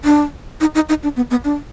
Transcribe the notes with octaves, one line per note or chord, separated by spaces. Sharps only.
D4
D#4
D#4
D#4
D4
B3
B3
D4